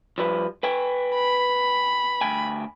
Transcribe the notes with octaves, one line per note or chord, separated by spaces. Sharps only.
F3 G3 B4
B4 G5 G#5
B5
D2 G5 G#5